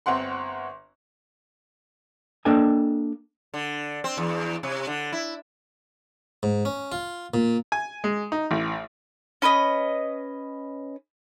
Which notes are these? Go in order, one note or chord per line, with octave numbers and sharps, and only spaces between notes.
G1 C4 F#5 C6
A#3 D4 A4 D#5 G5 G#5
D3
C4
E2
C3
D3
E4
G#2
C#4
F4
A#2
G#5
G#3
D#4
A1
C#4 B4 C5 D#5